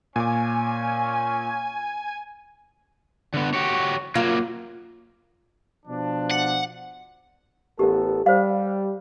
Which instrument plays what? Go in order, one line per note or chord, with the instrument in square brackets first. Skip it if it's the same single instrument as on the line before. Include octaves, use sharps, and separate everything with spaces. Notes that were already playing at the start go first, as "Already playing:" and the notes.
[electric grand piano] A#2 D6 [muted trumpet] C#4 [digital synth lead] G#5
[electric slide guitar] D3 B3
F#4 G4 C#5
[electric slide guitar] F#3 A#3 [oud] F4
[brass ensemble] B2 F3 D4
[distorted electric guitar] F#5
[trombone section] A1 B3 A4 [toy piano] G4 A#4
[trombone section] G3 [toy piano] C5 F5